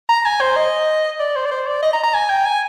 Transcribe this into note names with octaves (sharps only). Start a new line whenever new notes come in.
A#5
G#5
C5
D#5
D5
C5
D5
C5
D5
D#5
A#5
A#5
G#5
G5
G#5